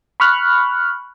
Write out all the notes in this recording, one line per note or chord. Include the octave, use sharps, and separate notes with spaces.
B5 C#6 F6 F#6